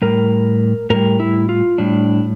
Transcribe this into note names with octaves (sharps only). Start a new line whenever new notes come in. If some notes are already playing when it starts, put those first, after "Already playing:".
A2 G3 A#4
A2 G3 A#4
E4
F4
A2 G3 D4